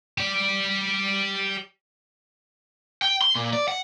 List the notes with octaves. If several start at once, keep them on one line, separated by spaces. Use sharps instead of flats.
G4 D5
G5
C6
A#2
D5
F#5